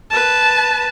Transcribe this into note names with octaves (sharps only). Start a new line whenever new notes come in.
B4 A5